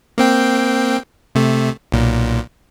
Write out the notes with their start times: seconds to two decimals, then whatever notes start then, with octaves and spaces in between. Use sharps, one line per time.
0.18 A#3 C4 G5
1.35 C3 A3
1.92 B1 A#2